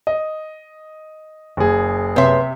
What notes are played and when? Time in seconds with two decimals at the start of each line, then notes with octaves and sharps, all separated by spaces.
0.07 D#5
1.57 F#1 G#4
2.16 C3 B4 C#5 E5 C6